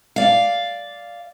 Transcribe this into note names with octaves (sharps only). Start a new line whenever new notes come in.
D5 F5